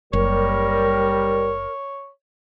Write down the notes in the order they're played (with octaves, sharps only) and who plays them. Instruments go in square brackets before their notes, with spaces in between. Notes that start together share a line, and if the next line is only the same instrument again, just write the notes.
[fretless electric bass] F#1 [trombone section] G3 [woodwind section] A#4 [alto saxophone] C#5